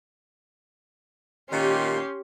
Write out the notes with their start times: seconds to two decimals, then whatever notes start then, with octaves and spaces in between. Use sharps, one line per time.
1.51 A#2 D#3 C#4 G4 C6